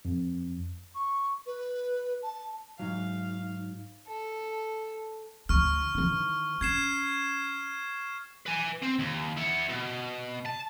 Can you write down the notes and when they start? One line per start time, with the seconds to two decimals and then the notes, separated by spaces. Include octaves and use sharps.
0.05 F2
0.95 C#6
1.46 B4
2.23 A5
2.79 G#2 F#3 D#4 F5
4.08 A4
5.49 D2 E3 C#6 F6
5.95 D#3 E3
6.61 C#4 G#6 C7 E7
8.46 B4 G#5
8.83 C4 C5
8.99 D#2
9.37 E4 F#5
9.69 B2
10.46 A5